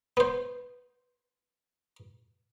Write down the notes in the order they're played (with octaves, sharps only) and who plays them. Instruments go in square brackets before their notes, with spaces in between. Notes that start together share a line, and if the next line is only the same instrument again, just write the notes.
[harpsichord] B3 C5